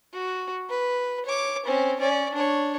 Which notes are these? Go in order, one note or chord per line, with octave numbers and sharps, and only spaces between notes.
F#4
B4
C#5 D6
C4 C#4
C#4 D5
D4 C#5